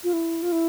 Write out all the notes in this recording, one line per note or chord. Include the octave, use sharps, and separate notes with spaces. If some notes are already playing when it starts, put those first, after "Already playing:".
F4
E4
F4
E4